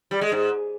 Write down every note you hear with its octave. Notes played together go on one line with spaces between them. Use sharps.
G3
G#3
G#2